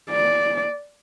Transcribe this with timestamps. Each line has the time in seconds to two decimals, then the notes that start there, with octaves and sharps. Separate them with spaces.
0.10 D5